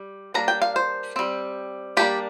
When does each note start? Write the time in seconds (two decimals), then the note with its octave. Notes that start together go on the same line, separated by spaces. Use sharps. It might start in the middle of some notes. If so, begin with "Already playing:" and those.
Already playing: G3
0.34 G3 A#3 D4 A#5
0.48 G5
0.62 F5
0.76 C5
1.16 G3 C4
1.97 G3 A#3 D4 G4